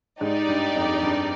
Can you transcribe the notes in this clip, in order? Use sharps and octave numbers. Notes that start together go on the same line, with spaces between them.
G#2 D#4 G4 D5
G2
F2
G2